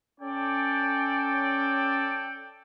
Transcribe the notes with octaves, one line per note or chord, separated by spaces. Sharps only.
C#4 A4 D5 G5